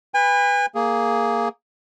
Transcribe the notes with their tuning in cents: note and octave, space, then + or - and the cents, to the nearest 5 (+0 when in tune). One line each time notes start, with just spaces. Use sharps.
B4 +0 G#5 -40 B5 +5
A#3 -5 G#4 +0